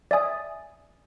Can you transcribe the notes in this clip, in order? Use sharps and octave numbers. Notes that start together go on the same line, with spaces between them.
D5 E5 G#5 D#6